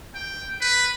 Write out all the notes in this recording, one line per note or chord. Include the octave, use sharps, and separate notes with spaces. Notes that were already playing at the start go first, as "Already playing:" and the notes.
G5
B4